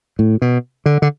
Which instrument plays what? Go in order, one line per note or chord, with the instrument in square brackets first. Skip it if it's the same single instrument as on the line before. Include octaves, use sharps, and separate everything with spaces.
[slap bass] A2
B2
D3
D3